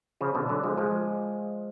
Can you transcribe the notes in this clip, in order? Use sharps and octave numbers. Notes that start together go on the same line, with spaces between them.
C#3 F3
B2 D3
D3 F#3
F3 G#3
F3 G#3